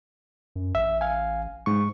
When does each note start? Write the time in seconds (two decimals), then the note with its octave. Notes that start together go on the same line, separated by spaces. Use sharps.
0.56 F#2
0.75 A1 E5
1.01 F5 G#5
1.66 G#2 C#6